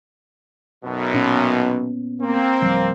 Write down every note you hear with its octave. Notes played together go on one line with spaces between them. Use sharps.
B1 F#2 B2
A#2 B3 C#4
A#3 C4
D1 F3 G3